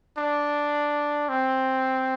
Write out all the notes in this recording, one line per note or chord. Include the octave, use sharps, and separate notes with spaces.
D4
C4